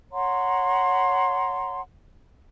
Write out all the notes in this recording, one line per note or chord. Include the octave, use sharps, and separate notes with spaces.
C#5 F#5 A#5 C6